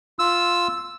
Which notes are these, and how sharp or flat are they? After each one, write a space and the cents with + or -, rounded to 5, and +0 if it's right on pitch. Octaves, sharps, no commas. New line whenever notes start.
F4 +0 E6 +0